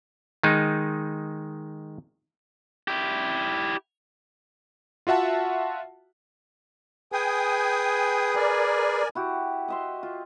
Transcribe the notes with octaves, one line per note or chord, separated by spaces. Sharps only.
D#3 G#3 D#4
E4 G4
F4 F#4 E5 F#5 A5
G#4 B4 G5 G#5 D#6
A#4 D5 G#5
E4 F#4 G4
D#5 E5 C6
F4